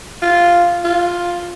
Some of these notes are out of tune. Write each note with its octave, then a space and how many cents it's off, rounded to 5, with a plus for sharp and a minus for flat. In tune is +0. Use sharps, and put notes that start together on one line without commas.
F4 -5
F4 +5